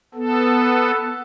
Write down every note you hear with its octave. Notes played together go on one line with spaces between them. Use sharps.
B3 A4